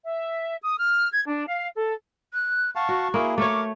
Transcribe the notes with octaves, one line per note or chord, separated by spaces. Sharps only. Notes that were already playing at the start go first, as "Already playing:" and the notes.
E5
D#6
F6
G#6
D4
F5
A4
F#6
F5 F#5 A5 C#6
F#4
A#3 E4 G#4
A3 A#4 C#5 D6